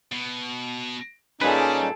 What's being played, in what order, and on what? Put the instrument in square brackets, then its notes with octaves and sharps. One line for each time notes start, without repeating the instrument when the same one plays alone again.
[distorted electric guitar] B2
[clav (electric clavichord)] A#2 B4 [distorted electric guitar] G3 [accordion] C#4 D#4 [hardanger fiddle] G#4 A4